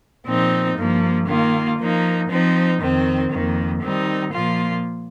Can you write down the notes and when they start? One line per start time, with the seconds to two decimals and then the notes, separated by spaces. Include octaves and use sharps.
0.27 A#2 F3 C4 D#4
0.77 G2 F3 A#3
1.28 D#3 A#3 F4
1.79 F3 A#3 D#4
2.30 F3 C4 D#4
2.81 F2 D#3 C4
3.31 F2 D#3 A#3
3.82 D#3 G3 C4 D#4
4.33 A#2 F3 A#3 F4